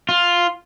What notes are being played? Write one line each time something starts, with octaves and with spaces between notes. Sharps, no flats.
F4